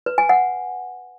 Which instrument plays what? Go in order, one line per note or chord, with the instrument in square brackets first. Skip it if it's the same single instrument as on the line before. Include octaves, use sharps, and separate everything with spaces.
[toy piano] B4
G#5
F#5